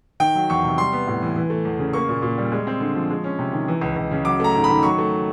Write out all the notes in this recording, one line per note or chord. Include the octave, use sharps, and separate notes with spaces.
D#3 G5
F#3
E2 C#6
C3
G3 C6
B3
A2
E3
E3
A3
E2
C#3
A#3 C#6
A#2
A#2
G3
G#3
C4
D3
F3
G#3
C#4
C3
D#3
E3
C#2
C#2
C#3
F#3 D6
A3 A#5
G#2
B5
D#3
F#3 C#6
A3